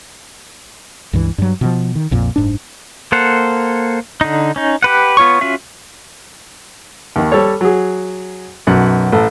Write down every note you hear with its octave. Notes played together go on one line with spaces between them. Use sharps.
C#2 G2 E3
G2 F#3
B2 D3 F3
D#3
A#1 F2 A#2
F#1 G#2 D4
A#3 A4 C5 F#5
D3 D#4
C#4 D#4
G4 B4 F#5
B3 F4 C#5 C#6
C#4 F4 F#4 E5
D#2 D#3
G3 A4 C#5
F#3 G#4
B1 F#2 F#5
A1 A4